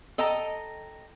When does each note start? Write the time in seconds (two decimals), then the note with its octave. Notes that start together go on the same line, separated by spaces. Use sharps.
0.18 A4 D#5 G5 A#5